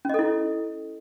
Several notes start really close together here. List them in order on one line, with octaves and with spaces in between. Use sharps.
C#4 D#5 A4 E4